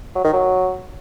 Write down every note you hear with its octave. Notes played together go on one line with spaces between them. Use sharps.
F#3
D#3
F#3